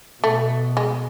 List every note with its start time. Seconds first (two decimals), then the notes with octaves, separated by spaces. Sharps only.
0.23 B2 A3
0.77 G#3